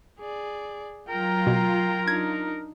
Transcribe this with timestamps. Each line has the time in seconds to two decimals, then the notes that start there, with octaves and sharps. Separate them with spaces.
0.19 G#4 D5
1.09 F#3 F4 A#4 G5 A#5
1.47 B2
2.08 D4 D#4 G#6